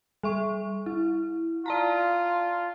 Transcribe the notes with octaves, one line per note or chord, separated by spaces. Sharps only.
G3 E5 C#6
E4
F4 D5 A5 A#5